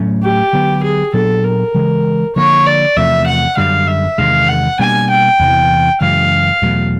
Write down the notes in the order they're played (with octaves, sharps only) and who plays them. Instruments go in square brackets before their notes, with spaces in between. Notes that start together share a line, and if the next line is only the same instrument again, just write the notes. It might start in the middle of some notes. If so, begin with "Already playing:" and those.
Already playing: [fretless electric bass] A2 F#3 A3 C#4
[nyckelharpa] G4
[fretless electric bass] D3 F#3 B3
[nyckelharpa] G#4
[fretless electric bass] A#2 F#3 B3 D4 [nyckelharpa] A4
[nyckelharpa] A#4
[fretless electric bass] C#3 E3 G#3
[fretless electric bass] D3 F3 A#3 [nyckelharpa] C#5
[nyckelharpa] D5
[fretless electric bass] E2 C3 F3 A3 [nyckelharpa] E5
[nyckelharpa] F#5
[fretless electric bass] F#2 D3 G3 [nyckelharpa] F5
[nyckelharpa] E5
[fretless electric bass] E2 C3 D#3 G#3 [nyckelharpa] F5
[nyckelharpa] F#5
[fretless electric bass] B2 G3 A#3 D4 [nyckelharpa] G#5
[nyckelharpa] G5
[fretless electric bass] E2 C3 E3
[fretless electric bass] F#2 C#3 E3 G#3 [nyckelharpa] F5
[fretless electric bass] E2 B2 F#3 A3